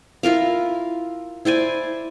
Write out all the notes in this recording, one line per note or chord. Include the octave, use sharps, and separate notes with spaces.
E4 F4 A#4 F5
E4 C5 D5 G#5